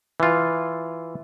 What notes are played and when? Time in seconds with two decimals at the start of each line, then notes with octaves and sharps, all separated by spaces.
0.20 E3 F4